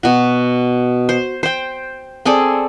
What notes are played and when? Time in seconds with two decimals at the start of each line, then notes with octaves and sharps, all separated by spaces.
0.03 B2 F#4
1.09 C5
1.43 C5 G5
2.25 C4 G#4 A4 D5